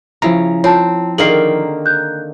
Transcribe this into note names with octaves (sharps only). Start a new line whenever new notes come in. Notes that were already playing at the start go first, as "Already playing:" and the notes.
C#3 F3 E4 A#5
C4 F4 C#5 A5
D3 D#3 A#3 G#4 A#4 E5 C7 F#7
F#6 G6